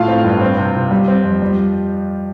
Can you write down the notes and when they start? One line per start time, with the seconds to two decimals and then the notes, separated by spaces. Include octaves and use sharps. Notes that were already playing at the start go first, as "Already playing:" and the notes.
Already playing: A2 A3 F4 F5
0.08 C4
0.24 G2
0.41 C4
0.57 C3
0.75 C3
0.91 G3
1.08 C4
1.24 F2
1.42 G3